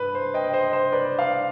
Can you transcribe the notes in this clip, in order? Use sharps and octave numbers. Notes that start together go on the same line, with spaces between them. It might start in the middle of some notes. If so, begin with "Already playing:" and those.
Already playing: G2 B4
C5
D#5 G5
C5 D#5
C5
B4 D5
D5 F5